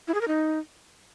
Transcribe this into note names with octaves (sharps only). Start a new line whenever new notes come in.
E4
G#4
A#4
D#4